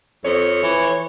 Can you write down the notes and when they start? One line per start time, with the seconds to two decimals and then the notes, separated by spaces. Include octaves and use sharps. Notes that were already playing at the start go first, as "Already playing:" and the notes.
0.25 F2 C#5
0.63 E3